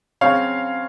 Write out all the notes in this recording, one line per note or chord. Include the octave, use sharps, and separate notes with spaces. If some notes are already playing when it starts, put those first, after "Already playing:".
C#3 F#3 C4 C#5 F5